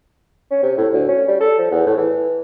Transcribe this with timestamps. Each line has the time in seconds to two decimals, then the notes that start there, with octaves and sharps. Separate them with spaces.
0.51 C#4
0.63 C3
0.77 A2
0.93 D2
1.08 C#4
1.28 G3
1.40 A4
1.58 F3
1.71 E2
1.86 A2
1.97 E3